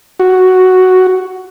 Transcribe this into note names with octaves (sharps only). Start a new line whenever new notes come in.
F#4